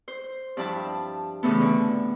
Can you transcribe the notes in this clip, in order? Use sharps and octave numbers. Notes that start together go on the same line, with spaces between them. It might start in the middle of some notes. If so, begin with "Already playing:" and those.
C5
G2 F3 D4 E4 A5
A2 C#3 E3 A3 B3
D3